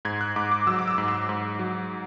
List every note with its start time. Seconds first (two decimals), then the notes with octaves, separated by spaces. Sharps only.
0.05 G#2 G#6
0.21 F#6
0.36 G#2 D6
0.51 D6
0.67 F#3 E6
0.79 D6
0.88 E6
0.98 G#2
1.08 E6
1.29 G#2
1.59 F#3